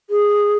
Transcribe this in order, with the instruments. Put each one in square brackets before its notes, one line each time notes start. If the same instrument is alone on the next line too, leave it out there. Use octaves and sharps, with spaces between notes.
[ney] G#4